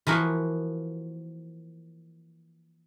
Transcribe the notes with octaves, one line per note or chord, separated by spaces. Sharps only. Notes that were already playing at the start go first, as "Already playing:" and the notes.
E3 F3 A#3 F#4